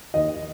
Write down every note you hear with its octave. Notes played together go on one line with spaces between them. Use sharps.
D#2 D#5